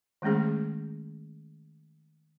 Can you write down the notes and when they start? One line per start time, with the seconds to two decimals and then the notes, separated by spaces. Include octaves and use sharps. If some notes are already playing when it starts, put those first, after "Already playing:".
0.22 D#3 G#3 A3 C#4 G#4